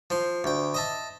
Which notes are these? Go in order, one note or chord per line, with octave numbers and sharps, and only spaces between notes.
F3 C6
D2 G5
D#5 E5 A5